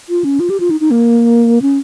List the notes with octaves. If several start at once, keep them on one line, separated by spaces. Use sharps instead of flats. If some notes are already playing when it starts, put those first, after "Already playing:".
F4
C#4
F4
G4
F4
D#4
D#4
A#3
C#4